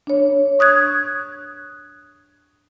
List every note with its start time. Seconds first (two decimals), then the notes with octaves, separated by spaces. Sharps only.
0.07 D4 C#5
0.59 C#6 D#6 F#6 G#6